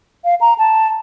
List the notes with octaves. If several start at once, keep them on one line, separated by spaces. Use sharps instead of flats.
F5
A#5
A5